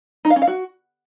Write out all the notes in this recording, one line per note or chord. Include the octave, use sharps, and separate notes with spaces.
D#4
F5
C#4
F5
F#4